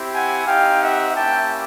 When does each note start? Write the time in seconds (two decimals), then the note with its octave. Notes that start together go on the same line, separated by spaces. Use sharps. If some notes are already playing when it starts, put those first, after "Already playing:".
Already playing: C4 E4 G4
0.13 F#5 G#5
0.46 C4 D#4 G4 F5 G5
0.80 E5 F#5
1.14 A#3 C#4 E4 G4 G5 A5